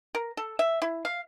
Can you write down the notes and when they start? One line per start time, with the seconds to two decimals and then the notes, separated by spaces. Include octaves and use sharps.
0.15 A#4
0.37 A4
0.59 E5
0.82 E4
1.05 F5